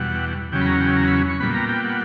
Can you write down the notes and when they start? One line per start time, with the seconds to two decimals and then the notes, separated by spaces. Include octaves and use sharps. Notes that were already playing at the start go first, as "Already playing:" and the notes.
Already playing: E2 B2 G3 F#5
0.52 E2 C#3 F#3 C#4 G5
0.61 B5
0.66 A#5
0.81 G5
0.97 A#5
1.07 B5
1.29 C#6
1.40 A#2 G3 B3 B5
1.54 A#5
1.69 G5
1.84 F#5